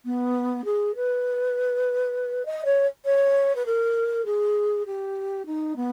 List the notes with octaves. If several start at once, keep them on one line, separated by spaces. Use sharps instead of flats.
B3
G#4
B4
D#5
C#5
C#5
B4
A#4
G#4
G4
D#4
B3